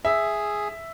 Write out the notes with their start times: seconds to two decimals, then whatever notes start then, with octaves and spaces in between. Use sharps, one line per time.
0.05 G#4 E5